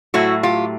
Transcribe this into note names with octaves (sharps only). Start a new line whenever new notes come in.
A2 F#3 A3 E4 F#4
F4 G4